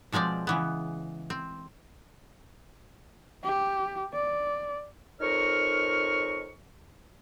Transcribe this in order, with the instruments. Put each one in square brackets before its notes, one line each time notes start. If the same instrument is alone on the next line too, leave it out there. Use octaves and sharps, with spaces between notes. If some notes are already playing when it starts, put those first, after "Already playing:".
[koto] B2 F3 G#3 C4 D5
C#3 E3 B3
C4
[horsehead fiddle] G4
D5
[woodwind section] F2 D#4 A#4 C#5 C#6 F6